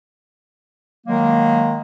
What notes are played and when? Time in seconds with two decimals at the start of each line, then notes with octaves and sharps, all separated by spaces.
1.07 D#3 F#3 G#3 A#3